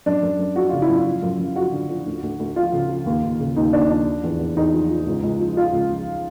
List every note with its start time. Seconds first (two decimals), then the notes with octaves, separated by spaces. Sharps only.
0.06 F#2 D4
0.23 F#2
0.39 F#2
0.56 F3 F#4
0.69 C#3 F4
0.82 E4
0.89 F#2
0.95 F4
1.06 F3
1.22 F#2
1.39 F#2
1.56 F3 F#4
1.73 D3
1.89 F3
2.06 D2
2.23 D2
2.39 D2
2.56 F3 F4
2.73 C#3
2.90 F3
3.06 D#2
3.23 D#2
3.39 C#3
3.56 D#2 D#4
3.73 D#2 D4
3.90 F3 D4
4.07 F3
4.23 E2
4.39 E2
4.56 E2 D#4
4.73 F3
4.89 F3
5.06 C#2
5.23 C#2
5.40 F3
5.57 F3 F4
5.73 C#2
5.90 F3